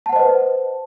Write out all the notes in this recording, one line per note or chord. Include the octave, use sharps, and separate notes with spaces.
B4 C5 D#5 F#5 A5